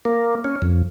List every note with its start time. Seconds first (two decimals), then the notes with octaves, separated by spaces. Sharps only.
0.05 A#3
0.44 C#4
0.62 F2